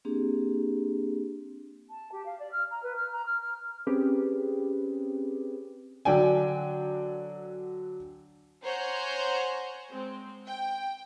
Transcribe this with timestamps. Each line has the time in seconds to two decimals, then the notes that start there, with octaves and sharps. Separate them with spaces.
0.05 A#3 C4 D4 G4 G#4
1.90 A5
2.12 G4
2.25 F5
2.39 D5
2.51 F6
2.70 A#5
2.83 B4
2.96 F6
3.12 A#5
3.26 F6
3.40 F6
3.87 C4 C#4 G4 G#4 B4
6.05 D3 F#3 D4 G5 G#5
8.64 C5 C#5 F#5 G#5 A#5 G6
9.90 G#3 C4
10.46 G5